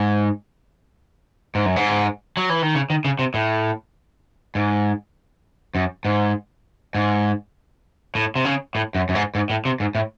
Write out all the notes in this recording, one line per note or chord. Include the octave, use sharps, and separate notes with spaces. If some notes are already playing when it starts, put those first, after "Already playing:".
Already playing: G#2
G#2
F#2
G#2
F#3
E3
D#3
C#3
D#3
C#3
C3
A2
G#2
F#2
G#2
G#2
A2
C3
C#3
A2
F#2
F#2
G#2
G#2
A2
C3
G#2
A2